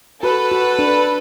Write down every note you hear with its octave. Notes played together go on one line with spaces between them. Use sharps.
F#4 A4 B4
F#4
D4